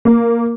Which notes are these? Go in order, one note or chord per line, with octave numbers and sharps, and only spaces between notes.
A#3